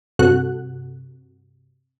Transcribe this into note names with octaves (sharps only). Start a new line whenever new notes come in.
G2 C3 F#4 A4 F#5 F#6